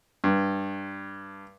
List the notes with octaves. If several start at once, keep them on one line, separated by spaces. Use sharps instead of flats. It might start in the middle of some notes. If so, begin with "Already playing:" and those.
G2